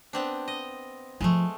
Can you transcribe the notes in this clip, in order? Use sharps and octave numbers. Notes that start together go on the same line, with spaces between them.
B3 C4 D4
D#5
F3 G#3 A3 F4